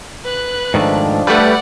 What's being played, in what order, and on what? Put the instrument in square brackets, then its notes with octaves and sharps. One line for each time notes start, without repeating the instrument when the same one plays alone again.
[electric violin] B4 F#6
[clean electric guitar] G#2 D#3 A3 [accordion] F3 D4
[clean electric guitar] G3 [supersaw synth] A3 B4 [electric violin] D5 F#5